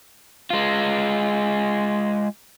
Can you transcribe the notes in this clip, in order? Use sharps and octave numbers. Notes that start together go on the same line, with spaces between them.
G#3 F4